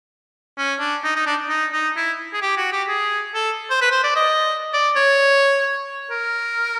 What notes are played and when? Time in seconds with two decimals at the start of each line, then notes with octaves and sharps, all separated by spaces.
0.58 C#4
0.80 D4
1.04 D#4
1.16 D#4
1.27 D4
1.50 D#4
1.73 D#4
1.96 E4
2.33 G#4
2.42 G4
2.57 F#4
2.73 G4
2.88 G#4
3.35 A4
3.70 C5
3.81 B4
3.92 C5
4.04 D5
4.16 D#5
4.74 D5
4.96 C#5
6.11 A#4